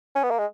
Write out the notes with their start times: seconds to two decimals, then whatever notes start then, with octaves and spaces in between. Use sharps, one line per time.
0.16 C#4
0.23 B3
0.31 A#3
0.38 G#3